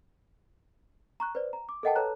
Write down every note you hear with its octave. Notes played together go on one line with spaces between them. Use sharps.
A#5 C#6 F#6
B4 C5 D5
A#5
D6
A4 A#4 D#5 F#5 G5 A5
A4 B4 C#5 A5 A#5 F#6